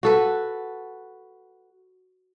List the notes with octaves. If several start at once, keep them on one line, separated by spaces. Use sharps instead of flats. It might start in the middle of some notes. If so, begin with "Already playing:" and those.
F#4 A4 B4